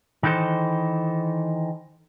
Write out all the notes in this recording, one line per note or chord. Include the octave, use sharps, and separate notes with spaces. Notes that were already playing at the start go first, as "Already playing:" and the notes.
D#3 E3 D#4 A4 C5